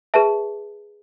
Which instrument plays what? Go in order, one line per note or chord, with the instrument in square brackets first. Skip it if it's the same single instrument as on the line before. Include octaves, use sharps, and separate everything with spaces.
[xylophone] G#4 B4 E5 A5